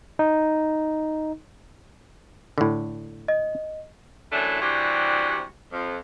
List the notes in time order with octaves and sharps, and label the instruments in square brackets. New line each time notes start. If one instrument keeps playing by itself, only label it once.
[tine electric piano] D#4
[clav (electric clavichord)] A2 D3
[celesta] D#5
[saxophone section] F#2 E3 A3 D4 E4
C3 E3 G3 C4 D4 F#4
F2